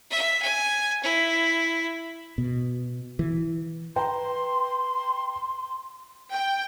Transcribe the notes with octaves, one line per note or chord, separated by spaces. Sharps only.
E5
G#5
E4
B2
E3
B4 G5 A#5 C6
G5